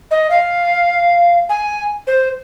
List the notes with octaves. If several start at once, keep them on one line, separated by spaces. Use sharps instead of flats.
D#5
F5
G#5
C5